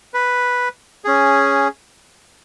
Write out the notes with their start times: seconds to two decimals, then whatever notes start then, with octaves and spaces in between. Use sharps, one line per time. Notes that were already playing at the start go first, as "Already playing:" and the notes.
0.14 B4
1.04 C#4 G#4